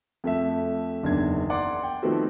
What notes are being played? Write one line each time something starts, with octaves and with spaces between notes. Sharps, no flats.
F2 A3 E5
F#1 E2 D#3 D4 G#6
A#4 D5 F#5 C6 D6
G5
D#3 F3 A3 B3 C4 F#4